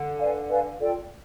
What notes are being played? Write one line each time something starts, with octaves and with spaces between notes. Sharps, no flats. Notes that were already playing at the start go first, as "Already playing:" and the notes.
Already playing: D3
B4 D5 F5 G#5
B4 D5 F5 G#5
F4 A4 D5 G5